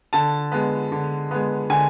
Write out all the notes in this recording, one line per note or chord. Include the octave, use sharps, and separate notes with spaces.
D3 A5
G#3 B3
D3
G#3 B3
D3 G#5